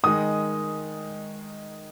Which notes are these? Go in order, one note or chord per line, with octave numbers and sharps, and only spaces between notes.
D#3 G#3 D#4 D#6